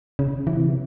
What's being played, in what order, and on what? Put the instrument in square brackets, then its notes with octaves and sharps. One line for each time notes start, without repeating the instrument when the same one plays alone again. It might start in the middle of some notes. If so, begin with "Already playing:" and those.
[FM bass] C#3
E3
C3
C#3